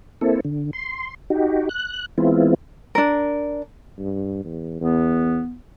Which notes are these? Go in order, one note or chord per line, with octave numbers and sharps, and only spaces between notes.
A#3 C4 E4 A4
D3
C6
D#4 F#4 G4
F#6
E3 G#3 B3 C4 E4 F4
D4 A#4
G2
E2
E2 B3